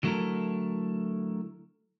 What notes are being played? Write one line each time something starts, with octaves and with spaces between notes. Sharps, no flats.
D3 F#3 A3 E4 A4 A#4